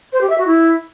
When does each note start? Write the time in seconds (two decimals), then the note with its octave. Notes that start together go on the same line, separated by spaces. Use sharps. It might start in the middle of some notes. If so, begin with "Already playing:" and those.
0.13 C5
0.21 G4
0.30 E5
0.38 F#4
0.46 E4